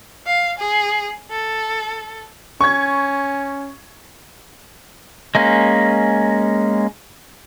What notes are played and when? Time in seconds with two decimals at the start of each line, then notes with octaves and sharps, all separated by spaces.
0.26 F5
0.59 G#4
1.31 A4
2.61 C#4 C#6 G#6
5.35 G#3 A#3 C#4